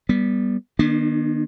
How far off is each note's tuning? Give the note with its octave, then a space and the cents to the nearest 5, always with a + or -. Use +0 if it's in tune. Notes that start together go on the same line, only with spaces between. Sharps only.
G3 +0 B3 -15
D#3 -20 B3 -40 D4 +30